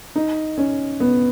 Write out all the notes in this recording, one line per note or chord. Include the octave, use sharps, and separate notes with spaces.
D#4
C#4
B3